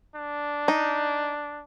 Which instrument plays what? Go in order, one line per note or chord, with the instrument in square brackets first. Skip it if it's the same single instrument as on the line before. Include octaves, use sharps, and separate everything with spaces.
[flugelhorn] D4
[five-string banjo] D#4